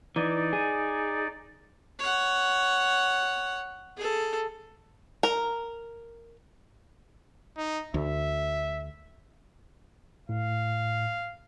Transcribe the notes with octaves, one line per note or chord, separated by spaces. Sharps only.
E3 D#4 D5
G#4
C#5 F#5
G#4 A4
A#4
D#4
D2 E5
A2 F5